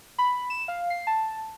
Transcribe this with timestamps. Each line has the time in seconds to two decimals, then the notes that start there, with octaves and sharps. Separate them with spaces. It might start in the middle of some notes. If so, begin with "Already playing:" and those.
0.18 B5
0.50 E7
0.68 F5
0.90 C7
1.07 A5